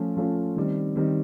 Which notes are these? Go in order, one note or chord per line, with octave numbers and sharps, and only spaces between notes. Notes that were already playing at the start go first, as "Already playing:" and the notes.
Already playing: F3 A3 C#4 F4
F3 A3 C#4 F4
D#3 G3 C4
D#3 G3 C4